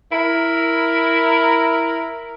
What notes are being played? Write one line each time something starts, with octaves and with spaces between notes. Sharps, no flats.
E4 A#4